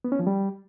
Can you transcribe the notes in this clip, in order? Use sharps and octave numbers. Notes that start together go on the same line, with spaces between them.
B3
C#4
F3
G3